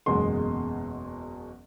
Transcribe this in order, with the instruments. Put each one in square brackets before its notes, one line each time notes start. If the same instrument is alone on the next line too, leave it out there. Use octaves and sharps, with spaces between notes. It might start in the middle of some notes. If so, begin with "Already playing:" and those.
[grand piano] F#1 E2 B2 G#3 C6